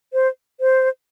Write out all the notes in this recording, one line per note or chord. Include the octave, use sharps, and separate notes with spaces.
C5
C5